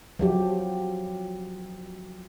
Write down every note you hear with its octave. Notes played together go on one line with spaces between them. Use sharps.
F3 F#3 G4